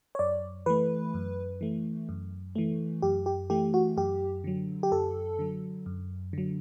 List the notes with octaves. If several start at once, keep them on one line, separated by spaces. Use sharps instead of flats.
C#5
F#2 D5
E3 A3 B4
F#2
E3 A3
F#2
E3 A3
F#2 G4
G4
E3 A3 G4
F#4
F#2 G4
D3 F#3
G4
F#2 A4
D3 F#3
F#2
D3 F#3